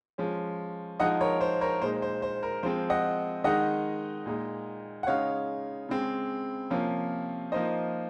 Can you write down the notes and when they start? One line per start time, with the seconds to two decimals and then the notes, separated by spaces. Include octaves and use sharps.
0.18 F3 G#3 C#4
1.00 F3 G#3 D#4 D#5 F#5
1.21 A#4 C#5
1.41 C5
1.61 A#4 C#5
1.82 A#2 G#3 D#4 C5
2.02 C5
2.22 C5
2.43 A#4
2.63 F3 G#3 C4 C5
2.90 D#5 F#5
3.44 D#3 G#3 D#4 D#5 F#5
4.26 A#2 G#3 D#4
5.03 F#5
5.07 C#3 G#3 D#4 C#5 F5
5.89 C#3 G#3 C4
6.70 C3 F3 A#3 C#4
7.52 F3 A#3 D#4 C5 D#5